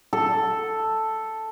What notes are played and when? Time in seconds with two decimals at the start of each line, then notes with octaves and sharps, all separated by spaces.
0.13 A4